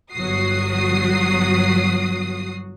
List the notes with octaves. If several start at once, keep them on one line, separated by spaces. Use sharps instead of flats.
G1 F#3 F#4 D#6 C7